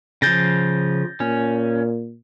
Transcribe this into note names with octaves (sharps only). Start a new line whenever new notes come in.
C#3 F3 G6 A6 A#6
A#2 C#4